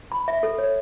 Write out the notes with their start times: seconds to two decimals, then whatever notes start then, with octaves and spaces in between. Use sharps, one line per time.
0.12 B5
0.28 E5
0.43 A4
0.58 C#5